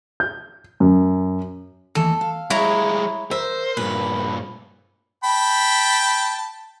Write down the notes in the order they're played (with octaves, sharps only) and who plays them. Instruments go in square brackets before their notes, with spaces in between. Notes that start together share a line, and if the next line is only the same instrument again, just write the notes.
[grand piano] G6
F#2
[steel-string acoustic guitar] D#2 E3 A3 [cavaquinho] A4
[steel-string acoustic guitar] F5
[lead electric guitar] G3 G#3 [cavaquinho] E4 C#5 A#5
[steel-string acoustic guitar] A#4 [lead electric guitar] C5 [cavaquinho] E5
[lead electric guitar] G2 A#2 [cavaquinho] B4
[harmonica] G5 A5 B5